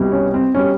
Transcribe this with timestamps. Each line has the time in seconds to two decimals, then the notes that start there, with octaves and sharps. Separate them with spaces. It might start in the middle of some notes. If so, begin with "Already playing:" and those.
Already playing: C2 B2 G3
0.12 C#4
0.34 C4
0.55 B2 G3 C#4